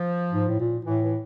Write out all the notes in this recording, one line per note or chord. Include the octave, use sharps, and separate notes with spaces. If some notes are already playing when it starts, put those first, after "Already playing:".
Already playing: F3
G#2
A2
A#2
A2 E3
E3